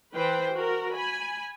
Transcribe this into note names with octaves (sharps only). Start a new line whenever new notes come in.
E3 B4 C5 G5
F#4 A#4
G#5 B5